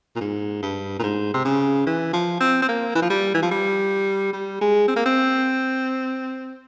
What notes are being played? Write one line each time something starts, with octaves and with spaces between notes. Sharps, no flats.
A#2
G#2
G2
A#2
G#2
C3
C#3
E3
F3
C4
C4
A#3
E3
F3
G3
E3
F3
G3
G3
G#3
C4
A#3
C4